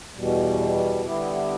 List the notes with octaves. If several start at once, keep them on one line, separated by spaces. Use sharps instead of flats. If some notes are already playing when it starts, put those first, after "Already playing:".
E2 B2 G3
D3 G3 B3 E4 G4